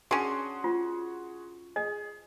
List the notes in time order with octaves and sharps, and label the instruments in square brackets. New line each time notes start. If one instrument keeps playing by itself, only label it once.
[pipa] C#4 D4 [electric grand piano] F#4 G#4 C6
[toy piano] F4
[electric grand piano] G#4 [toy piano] D#5